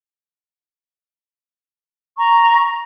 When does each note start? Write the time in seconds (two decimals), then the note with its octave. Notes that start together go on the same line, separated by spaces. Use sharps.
2.17 A#5 C#6